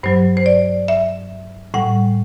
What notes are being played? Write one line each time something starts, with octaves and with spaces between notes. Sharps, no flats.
G2 F#3 C5
C5
D5
E5
A2 G3 F#5